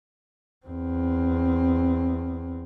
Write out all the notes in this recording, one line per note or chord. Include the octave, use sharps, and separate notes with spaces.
E2 C4